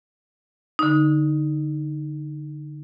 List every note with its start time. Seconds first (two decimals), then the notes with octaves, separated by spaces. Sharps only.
0.79 D3 D#4